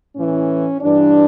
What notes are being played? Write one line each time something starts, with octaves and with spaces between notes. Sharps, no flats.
A2 E3 C#4
G2 E3 D4